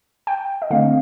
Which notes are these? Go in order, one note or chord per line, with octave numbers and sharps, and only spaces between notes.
G5
D#5
D3 A3 C4 F5